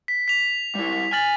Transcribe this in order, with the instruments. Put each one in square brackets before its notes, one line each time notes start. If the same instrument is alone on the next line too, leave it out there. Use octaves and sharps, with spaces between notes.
[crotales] B6
B6 F7
[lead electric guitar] G3 E4
[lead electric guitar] G#5 [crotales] F6 A6 F#7